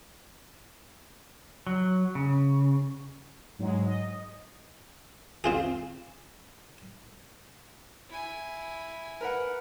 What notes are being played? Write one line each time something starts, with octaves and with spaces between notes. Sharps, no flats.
F#3
C#3
G#2 F#3 G#3
D#5
C4 F4 G#4
E4 G#5
A#4 B4 F#5